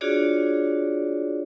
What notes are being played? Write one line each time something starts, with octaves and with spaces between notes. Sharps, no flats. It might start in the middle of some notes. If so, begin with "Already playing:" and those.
D4 F4 F#4 G#4 C#5 D5